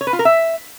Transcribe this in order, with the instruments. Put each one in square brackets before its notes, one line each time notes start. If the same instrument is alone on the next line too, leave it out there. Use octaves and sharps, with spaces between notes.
[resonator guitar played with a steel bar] C#5
B4
F4
A#4
E5